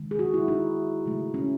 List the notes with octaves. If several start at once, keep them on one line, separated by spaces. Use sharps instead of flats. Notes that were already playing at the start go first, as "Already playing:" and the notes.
Already playing: D#3 G#3
G#4
F#4
E4
D#4
C#3 F#3 A3
C#4